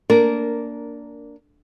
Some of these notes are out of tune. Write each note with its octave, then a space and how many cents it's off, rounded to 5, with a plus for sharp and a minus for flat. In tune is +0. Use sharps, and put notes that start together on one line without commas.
A#3 -10 D4 -15 A#4 +0